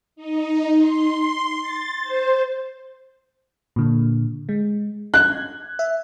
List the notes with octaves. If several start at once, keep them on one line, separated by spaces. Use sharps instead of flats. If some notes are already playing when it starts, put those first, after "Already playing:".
D#4
C6
A6
C5
A#2 D3
G#3
F#6 G#6
E5